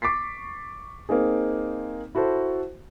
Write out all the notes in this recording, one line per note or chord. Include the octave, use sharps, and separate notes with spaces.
C#6 D6 A6 B6 C7
A#3 C4 D#4 G#4
E4 F#4 A4 C5